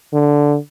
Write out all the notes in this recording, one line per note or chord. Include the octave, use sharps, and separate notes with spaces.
D3